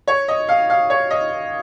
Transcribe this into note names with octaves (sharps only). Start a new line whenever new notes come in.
C#5
D#5
F5
F5
C#5
D#5